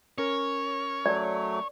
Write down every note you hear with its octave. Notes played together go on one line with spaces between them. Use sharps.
C#4 A#4 C#5
F#3 A3 D5